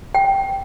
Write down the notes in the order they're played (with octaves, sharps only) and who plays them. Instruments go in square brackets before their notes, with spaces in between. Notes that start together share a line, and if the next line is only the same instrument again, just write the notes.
[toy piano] G5